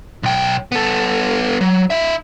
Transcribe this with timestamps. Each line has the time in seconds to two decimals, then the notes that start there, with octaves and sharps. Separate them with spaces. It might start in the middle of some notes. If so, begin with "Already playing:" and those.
0.23 B1 G5
0.72 B3 A4
1.61 F#3
1.90 D#4 E5